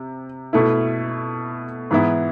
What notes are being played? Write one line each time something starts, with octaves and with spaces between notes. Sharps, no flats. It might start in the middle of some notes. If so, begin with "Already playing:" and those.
Already playing: C3
B2 A3 E4
G#2 E3 B3 E4